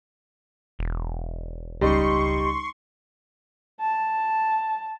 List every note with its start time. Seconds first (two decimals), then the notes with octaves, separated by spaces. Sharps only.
0.79 E1
1.81 C#2 C#3 G3 D#4 C6 C#6
3.81 A5